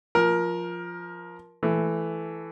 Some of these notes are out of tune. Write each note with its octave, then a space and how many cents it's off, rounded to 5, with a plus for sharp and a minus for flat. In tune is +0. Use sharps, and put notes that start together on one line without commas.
F3 +0 A#4 +15
E3 +5 A3 -15